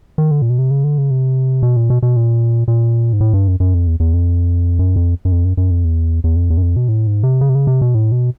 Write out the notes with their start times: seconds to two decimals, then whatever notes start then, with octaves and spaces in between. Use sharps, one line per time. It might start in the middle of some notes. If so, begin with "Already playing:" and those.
0.18 D#3
0.31 D3
0.42 A#2
0.50 B2
0.59 C3
0.71 C#3
0.84 D3
0.98 C#3
1.11 C3
1.63 B2
1.77 A#2
1.90 B2
2.03 B2
2.16 A#2
2.68 A#2
3.13 G#2
3.21 A2
3.33 G2
3.48 F#2
3.60 F#2
3.74 F2
3.87 E2
4.00 E2
4.14 F2
4.79 F#2
4.96 F2
5.25 F#2
5.32 F2
5.44 F#2
5.57 F#2
5.71 F2
5.84 E2
6.24 E2
6.36 F2
6.50 E2
6.57 F#2
6.62 F2
6.76 B2
6.88 A2
7.07 G#2
7.23 C3
7.41 C#3
7.49 C3
7.55 C#3
7.67 C3
7.81 B2
7.95 A2
8.12 B2